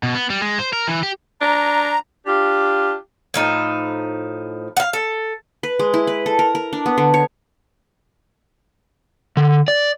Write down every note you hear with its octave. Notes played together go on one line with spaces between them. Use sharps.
B2
B3
G3
G#3
C5
A#4
E3
G4
D4 A#5
D4 F4 G4
A2 F3 D#4
F5 F#5
A4
B4
G#3
E4
B4
A4
A#4
A#4
D4
B3
D3
C#5
D3
D5